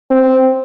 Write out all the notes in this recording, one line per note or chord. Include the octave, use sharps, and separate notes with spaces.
C4